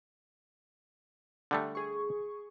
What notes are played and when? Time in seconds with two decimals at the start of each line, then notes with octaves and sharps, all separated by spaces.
1.51 D3 G3 A3
1.75 G#4 C#6